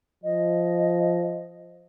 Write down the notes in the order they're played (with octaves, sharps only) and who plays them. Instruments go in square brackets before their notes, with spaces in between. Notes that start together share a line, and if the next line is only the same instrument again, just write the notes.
[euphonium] F3 [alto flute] D#5